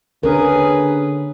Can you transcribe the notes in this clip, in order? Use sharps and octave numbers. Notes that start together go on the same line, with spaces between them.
D3 C#4 G#4 A#4 B4